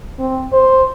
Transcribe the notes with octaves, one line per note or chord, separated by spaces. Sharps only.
C4
C5